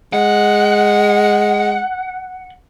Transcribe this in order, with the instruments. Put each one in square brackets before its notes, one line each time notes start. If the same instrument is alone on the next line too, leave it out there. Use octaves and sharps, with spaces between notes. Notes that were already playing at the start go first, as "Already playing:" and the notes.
[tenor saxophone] G#3 [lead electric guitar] F#5